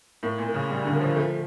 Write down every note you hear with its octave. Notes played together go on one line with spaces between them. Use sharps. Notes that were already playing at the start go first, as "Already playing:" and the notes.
A2 A#3
A#2
A#3
C#3
G3
D3
A#3
F3
F3 A3